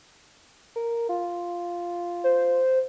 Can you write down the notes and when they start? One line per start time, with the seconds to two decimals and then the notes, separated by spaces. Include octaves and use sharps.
0.76 A#4
1.09 F4
2.24 C5